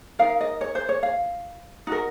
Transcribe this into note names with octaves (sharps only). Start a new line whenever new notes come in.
D#4 A#4 F5
D#5
C#5
C5
C#5
F5
D#4 F#4 A#4